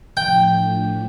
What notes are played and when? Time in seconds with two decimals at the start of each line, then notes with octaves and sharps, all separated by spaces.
0.17 A2 F3 A3 D4 G5